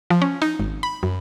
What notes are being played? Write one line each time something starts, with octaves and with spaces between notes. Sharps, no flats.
F3
C#4
D#4
G#1
B5
F#2